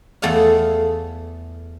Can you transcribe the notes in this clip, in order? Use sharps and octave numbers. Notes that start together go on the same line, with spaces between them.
E2 A3 G#4 E5 F5